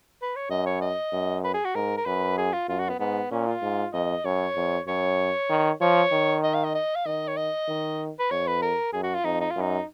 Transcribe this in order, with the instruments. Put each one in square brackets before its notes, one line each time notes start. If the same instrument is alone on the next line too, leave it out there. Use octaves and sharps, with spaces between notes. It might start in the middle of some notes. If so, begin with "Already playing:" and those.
[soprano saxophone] B4
C#5
[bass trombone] F#2 [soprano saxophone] D#5
[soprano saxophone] C#5
D#5
[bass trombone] F#2
[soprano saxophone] B4
G#4
F#4
[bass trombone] G#2 [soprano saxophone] A#4
[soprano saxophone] A#4
[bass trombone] F#2 [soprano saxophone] B4
[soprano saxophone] G#4
F4
[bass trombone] F#2 [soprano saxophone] F4
[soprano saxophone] F#4
B3
[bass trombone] G#2 [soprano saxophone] B3
[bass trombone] A#2 [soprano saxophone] C#4
[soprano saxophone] F4
[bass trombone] G#2
[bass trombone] F2 [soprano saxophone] D#5
[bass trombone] F#2 [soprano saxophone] C#5
[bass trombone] F2
[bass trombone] F#2 [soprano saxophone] C#5
[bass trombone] D#3
[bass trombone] F3 [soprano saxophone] C#5
[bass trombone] D#3
[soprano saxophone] D#5
F5
D#5
D#5
F5
[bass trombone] D#3 [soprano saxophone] D#5
[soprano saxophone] C#5
D#5
[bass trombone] D#3
[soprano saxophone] B4
[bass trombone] F2 [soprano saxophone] C#5
[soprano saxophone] B4
A#4
[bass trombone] F#2 [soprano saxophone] G#4
[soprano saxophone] F#4
F4
[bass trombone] F2 [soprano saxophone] D#4
[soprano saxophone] D#4
F4
[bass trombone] F#2 [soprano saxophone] D#4